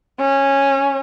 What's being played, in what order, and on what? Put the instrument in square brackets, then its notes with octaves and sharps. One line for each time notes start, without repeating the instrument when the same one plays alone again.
[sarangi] C#4